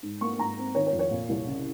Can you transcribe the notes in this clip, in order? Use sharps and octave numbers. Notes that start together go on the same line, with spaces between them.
G#2
A#3 C#6
G#2 A#5
C4
D#3 C#5
C#5
F2
C#5
A#2
C2
C#3